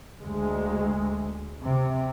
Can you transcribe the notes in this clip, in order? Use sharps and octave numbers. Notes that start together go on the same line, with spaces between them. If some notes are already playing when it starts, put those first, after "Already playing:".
D2 G#3
C3